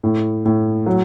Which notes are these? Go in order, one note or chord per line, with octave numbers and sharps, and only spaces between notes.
A2
A2
F#3